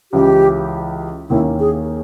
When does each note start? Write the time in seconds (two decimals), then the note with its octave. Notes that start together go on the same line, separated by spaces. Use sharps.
0.12 C#2 C#3 E3 G4
1.29 D#2 D#3 A#3 C#4 E4
1.60 G#4